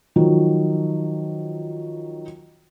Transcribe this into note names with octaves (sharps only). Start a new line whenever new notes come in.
D#3 F3 F#3